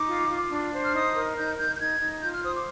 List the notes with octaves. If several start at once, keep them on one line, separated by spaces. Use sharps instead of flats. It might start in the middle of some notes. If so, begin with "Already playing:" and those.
Already playing: D#4 D6
F4
F4
D4
C5
F6
D#4 D#6
A#4
D#4 G6
D#4 G6
G6
D#4 G#6
D#4
F4 G6
F6
C5 D#6
D6